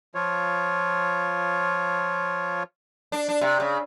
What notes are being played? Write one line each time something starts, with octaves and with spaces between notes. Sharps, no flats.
F3 F4 C#5
D4
D4
C3
C#3